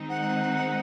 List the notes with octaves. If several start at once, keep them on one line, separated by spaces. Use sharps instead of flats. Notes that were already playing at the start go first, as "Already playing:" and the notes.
Already playing: D#3 G#3 C4 D#4
F#5